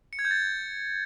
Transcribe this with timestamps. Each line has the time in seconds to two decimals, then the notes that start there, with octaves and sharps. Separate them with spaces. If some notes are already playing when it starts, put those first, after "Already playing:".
0.13 C#7
0.19 G#6
0.25 G6
0.31 A6